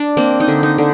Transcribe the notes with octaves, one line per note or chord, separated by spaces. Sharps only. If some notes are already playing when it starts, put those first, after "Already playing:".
Already playing: D4
A#3 C4
D#4
D3
D#4
D3